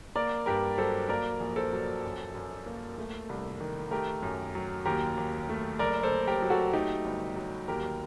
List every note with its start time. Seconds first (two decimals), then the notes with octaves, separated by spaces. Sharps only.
0.15 A#3 A#4 D5
0.46 G2 G4 A#4
0.78 F#3 A4 C5
1.09 A#3 A#4 D5
1.40 A#1
1.56 A4 C5
1.73 F#3
2.03 F#2
2.35 F#2
2.66 A#3
2.98 A3
3.29 C2
3.61 D#3
3.91 A3 G4 A#4
4.22 F#2
4.55 F#3
4.85 D#2 G4 A#4
5.17 D#2
5.49 A3
5.79 F#1 A#4 D5
6.03 A4 C5
6.12 F#1
6.27 G4 A#4
6.42 F#3
6.50 F#4 A4
6.73 A3 D#4 G4
7.05 G1
7.36 F#3
7.68 D#2 G4 A#4